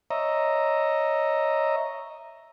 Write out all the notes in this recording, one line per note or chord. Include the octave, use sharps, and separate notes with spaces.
C#5 D#5 E5 A#5